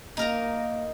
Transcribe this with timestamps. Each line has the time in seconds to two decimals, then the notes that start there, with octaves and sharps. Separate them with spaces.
0.17 A#3 D#4 A#4 A#5